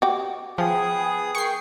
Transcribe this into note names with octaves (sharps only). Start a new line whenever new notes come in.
F#4 G4
F3 B3 G#4 G5 D#6
G#4 A#4 G5 C#6 C7